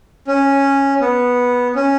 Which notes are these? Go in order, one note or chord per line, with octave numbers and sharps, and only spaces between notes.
C#4
B3
C#4